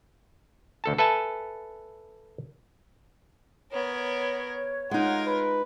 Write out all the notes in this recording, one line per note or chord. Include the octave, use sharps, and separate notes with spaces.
D2 A4 A5
A4 B4 E5 G#5 A5
B3 A#4 C#5
G#3 D#4 F4 A#4 F#5
B4